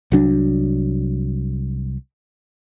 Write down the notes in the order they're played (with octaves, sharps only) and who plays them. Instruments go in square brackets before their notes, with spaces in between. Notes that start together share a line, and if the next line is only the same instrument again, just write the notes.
[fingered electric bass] C2 F#3 D4